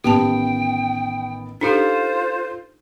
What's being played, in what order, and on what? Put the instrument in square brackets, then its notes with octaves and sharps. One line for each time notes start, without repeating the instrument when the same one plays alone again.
[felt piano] A1 D#3 B3 [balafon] G4 A5 [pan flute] G5
[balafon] D4 D#4 G4 [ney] F4 [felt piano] A4 [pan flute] C5